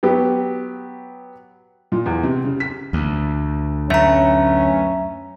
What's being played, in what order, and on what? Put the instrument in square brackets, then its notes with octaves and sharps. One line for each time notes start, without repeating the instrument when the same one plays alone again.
[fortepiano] F#3 B3 G4
[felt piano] A#2
E2
C3
C#3
B6
[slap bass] D2
[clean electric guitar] F#2 A3 B3 [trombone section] C#4 [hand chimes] E5 A#5